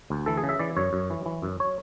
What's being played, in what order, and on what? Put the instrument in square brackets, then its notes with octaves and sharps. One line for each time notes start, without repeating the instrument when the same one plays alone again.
[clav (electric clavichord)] D2
E3 A4
G#4
C#3
E5
E3 D5
F#2 C#5
F#2
E3
E3
F#2
C#5